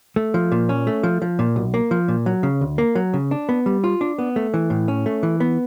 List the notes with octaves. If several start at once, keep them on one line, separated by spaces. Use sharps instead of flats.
A3
F3
A#2
C#4
A3
F3
F3
A#2
B1
A#3
F3
A#2
F#3
C#3
D2
A#3
F#3
C#3
D4
B3
G3
F4
D4
B3
A3
E3
A2
C#4
A3
E3
B3